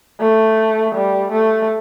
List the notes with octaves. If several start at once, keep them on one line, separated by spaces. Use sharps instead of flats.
A3
G3
A3